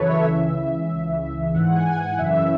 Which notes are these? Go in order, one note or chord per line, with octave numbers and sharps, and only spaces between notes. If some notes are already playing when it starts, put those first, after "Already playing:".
Already playing: F#2 C#3 E3 A4 B4 C#5
E5
C#2 C#3 E3 E5
C#2 C#3 E3
G#2 E3 F#5
G#5
F#5
F#2 C#3 E3 E5